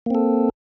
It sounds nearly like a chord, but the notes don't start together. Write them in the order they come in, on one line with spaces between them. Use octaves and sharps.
A#3 C4 A4